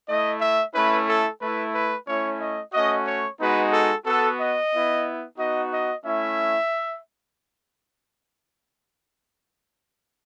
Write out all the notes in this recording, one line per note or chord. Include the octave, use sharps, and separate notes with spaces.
A3 E4 D#5
E5
A3 C#4 E4 B4
A4
A3 E4 B4
B4
A3 C#4 E4 C#5
D#5
A3 C#4 F#4 D#5
C#5
G#3 B3 D#4 F#4 B4
A4
B3 F#4 A4
D#5
B3 E4
B3 D#4 F#4 D#5
D#5
A3 C#4 E4 E5